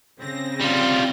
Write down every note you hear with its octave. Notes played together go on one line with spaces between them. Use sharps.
C#3 C4 A#6
G3 F4